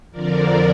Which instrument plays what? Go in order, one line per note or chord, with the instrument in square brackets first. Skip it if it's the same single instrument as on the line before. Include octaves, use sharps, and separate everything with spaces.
[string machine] F2 D3 F3 A#4 D5